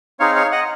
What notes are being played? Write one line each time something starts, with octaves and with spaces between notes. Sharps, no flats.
C4 D#4 G#4 C#5 F5
C#5 F5
D#5 F#5